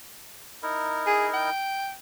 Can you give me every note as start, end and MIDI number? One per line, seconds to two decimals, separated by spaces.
0.63 1.50 63
0.63 1.50 64
0.63 1.50 70
1.07 1.28 68
1.34 1.93 79